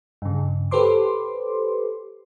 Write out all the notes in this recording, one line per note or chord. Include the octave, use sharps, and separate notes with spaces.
G2 C#3
G4 A4 B4 C5 C6 D6